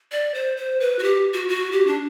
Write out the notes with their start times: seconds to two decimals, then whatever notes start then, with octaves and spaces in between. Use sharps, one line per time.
0.12 D5
0.34 C5
0.57 C5
0.80 B4
0.99 F#4
1.03 G4
1.34 F#4
1.49 F#4
1.72 G4
1.87 D4